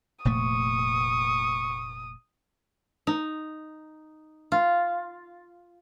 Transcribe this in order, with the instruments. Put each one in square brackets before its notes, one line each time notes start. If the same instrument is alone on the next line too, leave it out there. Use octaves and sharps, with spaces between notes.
[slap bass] F1 A#2 A3 [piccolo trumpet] C#6 [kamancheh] D#6
[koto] D#4
F4